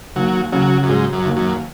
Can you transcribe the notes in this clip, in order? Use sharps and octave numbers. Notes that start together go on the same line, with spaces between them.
D#2 F#3
C#3 F#3
F#2
G#2 F#3
F#2
D#2
F#2